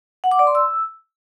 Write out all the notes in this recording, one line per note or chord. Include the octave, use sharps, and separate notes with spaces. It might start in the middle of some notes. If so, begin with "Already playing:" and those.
F#5
D6
D5
C6
E6